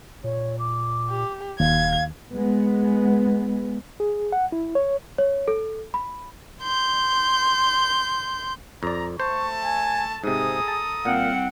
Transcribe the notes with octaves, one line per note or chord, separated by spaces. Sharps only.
A#2 C#5
D6
G4
D#1 D#2 F5 G#6
G#3 B3
G#4
F#5
E4
C#5
C#5
A4
B5
C6 G6
F2 D5 A#5
A3 C5 A5 C#6
G#5
G#2 C3 G#4 A4 A#5 D#6
A5
C2 A#2 C4 F5 F#5